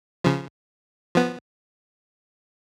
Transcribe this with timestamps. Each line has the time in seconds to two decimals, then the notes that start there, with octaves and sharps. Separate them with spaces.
0.24 C#3 F3
1.14 F3 B3